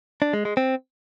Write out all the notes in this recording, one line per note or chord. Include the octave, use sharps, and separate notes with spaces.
D4
G#3
G#3
C4